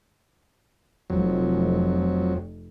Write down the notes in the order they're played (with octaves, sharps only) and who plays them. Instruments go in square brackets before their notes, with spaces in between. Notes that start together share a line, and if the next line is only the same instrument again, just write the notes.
[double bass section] F1 [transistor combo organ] F2 F#3